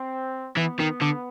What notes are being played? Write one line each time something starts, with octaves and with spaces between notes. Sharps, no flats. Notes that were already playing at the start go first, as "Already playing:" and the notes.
Already playing: C4
E3 B3
D#3
D3